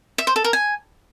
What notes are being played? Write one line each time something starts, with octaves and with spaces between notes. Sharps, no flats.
E5
C5
A4
A#4
G#5